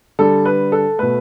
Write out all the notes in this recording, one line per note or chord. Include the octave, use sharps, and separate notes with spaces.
D3 G3 A4
B4
A4
B2 A3 B4